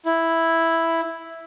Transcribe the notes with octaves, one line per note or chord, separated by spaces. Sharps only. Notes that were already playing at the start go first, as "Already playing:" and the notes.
E4